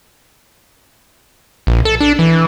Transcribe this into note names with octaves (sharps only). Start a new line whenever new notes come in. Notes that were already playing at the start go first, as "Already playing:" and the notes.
A#1
A4
D4
E3